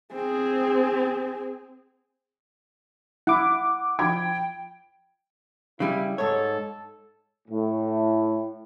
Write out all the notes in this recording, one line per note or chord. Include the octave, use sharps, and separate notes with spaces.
C4 G#4
E4 F#5 D6
F3 G5 B5 G#6
C#3 G3 E4
G#2 A4 C#5
A2